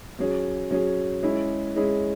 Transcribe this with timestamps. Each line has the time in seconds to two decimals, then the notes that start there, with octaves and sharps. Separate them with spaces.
0.19 F#3 C#4 G#4
0.71 F#3 C#4 G#4
1.23 G#3 C#4 E4 G#4
1.76 G#3 C#4 E4 G#4